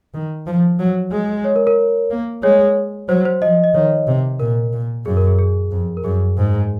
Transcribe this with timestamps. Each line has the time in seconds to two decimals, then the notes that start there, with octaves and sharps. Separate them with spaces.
0.14 D#3
0.47 F3
0.79 F#3
1.12 G#3
1.44 C#5
1.56 A#4
1.67 A#4
2.10 A#3
2.43 G#3 C#5
3.09 F#3 C5
3.25 C5
3.42 F3 D#5
3.64 D#5
3.74 D#3 C#5
4.07 C3
4.40 A#2 A#4
4.73 A#2
5.05 F#2 G#4
5.17 A#4
5.27 G#4
5.39 G#4
5.72 F2
5.97 A#4
6.04 F#2 G#4
6.37 G#2